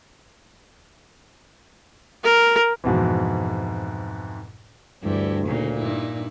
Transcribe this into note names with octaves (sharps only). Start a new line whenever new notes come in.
A#4
F2 G#2 B2 E3
D2 G2 E3 G3 E4
A#2 C#3 A#3 D#4
G2 D#4 E4